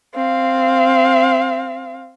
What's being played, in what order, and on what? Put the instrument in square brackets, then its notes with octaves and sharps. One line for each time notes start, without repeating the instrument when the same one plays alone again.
[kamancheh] C4 F5